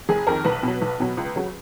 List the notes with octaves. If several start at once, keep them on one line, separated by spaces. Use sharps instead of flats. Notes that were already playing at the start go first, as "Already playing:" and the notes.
F#1 G#4
F2 D#3 A#4
B1 B4
B2 F#3
B1
B2 F#3
C#2
C#3 F#3